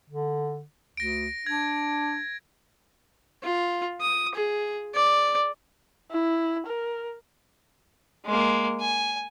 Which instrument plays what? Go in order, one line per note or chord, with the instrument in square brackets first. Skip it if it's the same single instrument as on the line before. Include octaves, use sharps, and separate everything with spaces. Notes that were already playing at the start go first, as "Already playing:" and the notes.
[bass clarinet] D3
[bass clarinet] D2 [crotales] A#6 D7
[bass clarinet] D4 [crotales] G#6
[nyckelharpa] F4
D#6
G#4
D5
[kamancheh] E4
A#4
[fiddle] G#3 A#3
G#5